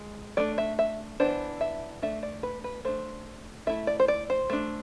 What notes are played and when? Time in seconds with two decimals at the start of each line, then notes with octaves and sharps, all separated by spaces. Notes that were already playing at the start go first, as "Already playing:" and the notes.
Already playing: G#3
0.37 A3 D4 D5
0.58 E5
0.79 E5
1.20 E3 B3 D4 C5
1.61 E5
2.02 A3 D4 E5
2.23 D5
2.43 B4
2.64 B4
2.85 A3 D4 C5
3.67 A3 E4 E5
3.87 D5
4.00 C5
4.08 D5
4.30 C5
4.50 A3 D4